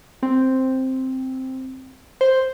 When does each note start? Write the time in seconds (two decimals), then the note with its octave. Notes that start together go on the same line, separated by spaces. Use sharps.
0.23 C4
2.21 C5